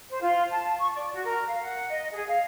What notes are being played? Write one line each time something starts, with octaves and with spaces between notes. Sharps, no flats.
C5
F4
A5
C#6
D5
F#4
A#4
F5
F#5
D#5
G#4
F5